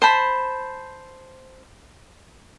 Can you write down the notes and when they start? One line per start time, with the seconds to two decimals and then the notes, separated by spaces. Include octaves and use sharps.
0.02 C5 A5 B5